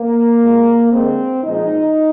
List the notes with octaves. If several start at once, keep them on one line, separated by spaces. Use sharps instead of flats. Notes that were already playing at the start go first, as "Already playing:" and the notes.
Already playing: A#3
A#2 G#3
D3 G#3 C4
A#2 F3 G#3 D#4